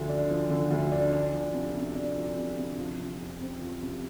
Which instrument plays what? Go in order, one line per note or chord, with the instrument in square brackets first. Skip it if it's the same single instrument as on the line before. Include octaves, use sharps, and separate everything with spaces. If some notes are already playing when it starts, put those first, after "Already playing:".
Already playing: [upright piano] D2 D3 F3
D4
F3
D3
D2
D4
D4
F3
C3
C3
D4
F3
C3
C3
F3
C3
F2
C4
F3
C3